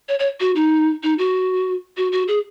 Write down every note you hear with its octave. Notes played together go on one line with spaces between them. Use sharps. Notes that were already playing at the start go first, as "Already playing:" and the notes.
C#5
C#5
F#4
D#4
D#4
F#4
F#4
F#4
G#4